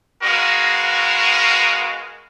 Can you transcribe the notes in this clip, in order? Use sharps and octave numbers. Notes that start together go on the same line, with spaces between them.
G#3 B3 F#4 A#4 F5